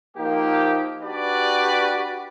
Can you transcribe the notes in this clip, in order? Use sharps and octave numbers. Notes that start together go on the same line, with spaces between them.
F3 A#3 D#4 G4
D4 F#4 G4 B4 D5